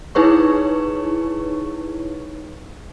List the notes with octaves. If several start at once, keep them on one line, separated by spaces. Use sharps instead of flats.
D#4 E4 G#4 B4 C#5 C#6